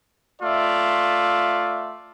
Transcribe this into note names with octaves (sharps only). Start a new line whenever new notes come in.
A3 F4 D5 E5